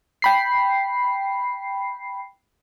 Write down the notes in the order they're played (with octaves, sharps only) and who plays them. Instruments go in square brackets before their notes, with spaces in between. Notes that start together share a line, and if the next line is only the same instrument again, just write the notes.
[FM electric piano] G5 B5 C7